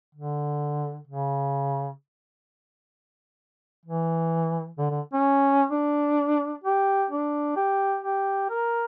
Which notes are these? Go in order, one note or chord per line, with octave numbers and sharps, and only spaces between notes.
D3
C#3
E3
D3
D3
C#4
D4
G4
D4
G4
G4
A#4